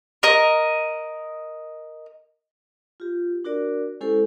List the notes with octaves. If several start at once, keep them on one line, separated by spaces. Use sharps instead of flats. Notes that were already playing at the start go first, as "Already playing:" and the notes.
A#4 D#5
F4 G4
D4 F#4 A#4 D5
G#3 C#4 E4 G4 A4 C5